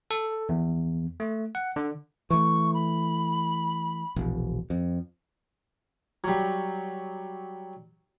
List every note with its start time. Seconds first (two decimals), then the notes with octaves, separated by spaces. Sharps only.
0.11 A4
0.49 E2
1.20 A3
1.55 F#5
1.76 D3
2.30 E3 A3 C#6
2.74 B5
4.16 E1 A#1
4.70 F2
6.24 F#3 G3